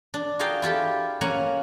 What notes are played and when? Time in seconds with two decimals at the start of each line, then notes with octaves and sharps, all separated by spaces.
0.14 D4
0.39 F4 F#4 G#4 A#4 F5 G5
0.62 E4 F4 G4 A4
1.21 A#3 C#4 F#5 G#5 A#5